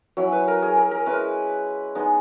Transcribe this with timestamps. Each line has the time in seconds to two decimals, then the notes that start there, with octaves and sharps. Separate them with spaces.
0.17 F#3 C#4 E4 C#5
0.32 B4
0.48 A#4
0.62 G#4
0.77 A#4
0.91 A#4
1.06 G#3 C#4 E4 B4
1.95 G#3 B3 D#4